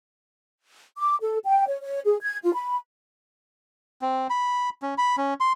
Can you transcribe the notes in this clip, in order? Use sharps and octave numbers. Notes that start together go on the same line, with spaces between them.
D6
A4
G5
C#5
C#5
G#4
G#6
F4
B5
C4
B5
C#4
B5
C#4
C6